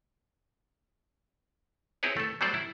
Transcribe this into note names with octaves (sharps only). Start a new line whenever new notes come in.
C4 E4 G4 G#4 B4 C#5
A3 A4
F#3 G3 A3 A4 C5 D5
E4